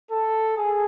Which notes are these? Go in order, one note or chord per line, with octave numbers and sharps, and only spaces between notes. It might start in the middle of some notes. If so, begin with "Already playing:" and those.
A4
G#4